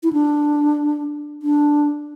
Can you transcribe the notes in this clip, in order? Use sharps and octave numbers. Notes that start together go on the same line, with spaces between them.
E4
D4
D4